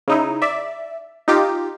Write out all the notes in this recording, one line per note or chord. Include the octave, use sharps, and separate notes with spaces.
C#3 D#4 E4
D5 E5
D#4 F4 G4